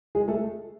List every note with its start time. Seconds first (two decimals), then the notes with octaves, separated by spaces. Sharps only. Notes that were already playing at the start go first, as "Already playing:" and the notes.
0.15 G#3 G#4
0.28 A3 A4